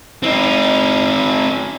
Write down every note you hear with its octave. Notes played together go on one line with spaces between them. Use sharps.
C4 D#4